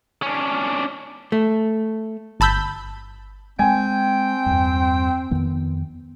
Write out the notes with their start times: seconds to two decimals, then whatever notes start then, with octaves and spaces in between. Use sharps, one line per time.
0.22 C#4 D4
1.32 A3
2.40 G1 A5 B5 E6 G6
3.59 G#3 C4 G5 G#5
4.46 E2 G2
5.31 F2 D#3 B3